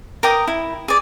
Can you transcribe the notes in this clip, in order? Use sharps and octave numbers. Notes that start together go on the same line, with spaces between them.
A#4 G5 D6 D#6
E4
G#4 D5